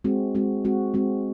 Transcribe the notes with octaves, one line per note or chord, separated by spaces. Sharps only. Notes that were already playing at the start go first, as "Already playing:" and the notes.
G#3 C4 F#4
G#3 C4 F#4
G#3 C4 F#4
G#3 C4 F#4